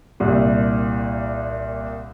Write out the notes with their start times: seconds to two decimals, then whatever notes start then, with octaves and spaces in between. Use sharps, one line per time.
0.20 C2 A#2